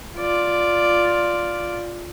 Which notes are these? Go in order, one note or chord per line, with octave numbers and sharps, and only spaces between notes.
F4 D5